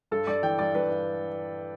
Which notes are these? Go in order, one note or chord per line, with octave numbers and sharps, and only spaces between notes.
G2 A4
G2 D5
E3 G5
G2 D5
G2 B4
G2